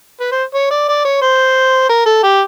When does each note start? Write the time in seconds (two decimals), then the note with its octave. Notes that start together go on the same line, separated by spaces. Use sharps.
0.20 B4
0.32 C5
0.54 C#5
0.71 D5
0.89 D5
1.05 C#5
1.22 C5
1.89 A#4
2.06 A4
2.23 G4